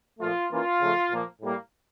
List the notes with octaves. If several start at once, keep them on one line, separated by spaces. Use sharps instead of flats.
A#2 F3 A3 F4
E3 A#3 C#4 F4
C#3 F3 A3
A#2 F3 A#3
A2 G3 A#3